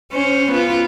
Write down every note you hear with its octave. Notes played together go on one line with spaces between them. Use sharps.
C#4 C5
B3 F4